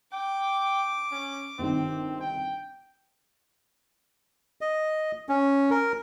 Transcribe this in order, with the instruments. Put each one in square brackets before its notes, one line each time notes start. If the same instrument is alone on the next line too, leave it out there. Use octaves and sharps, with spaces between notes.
[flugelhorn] G5 [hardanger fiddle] D6
[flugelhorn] C#4
[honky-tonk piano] G1 C3 D#3 [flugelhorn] C4
[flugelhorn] G5
[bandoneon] D#5
C#4
A#4